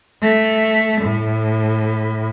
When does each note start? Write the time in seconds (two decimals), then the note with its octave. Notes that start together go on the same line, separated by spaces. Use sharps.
0.22 A3
1.01 A2